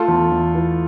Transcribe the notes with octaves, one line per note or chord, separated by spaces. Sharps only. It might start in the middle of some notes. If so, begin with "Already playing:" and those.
Already playing: A3 F4 A4
E2
E2
E3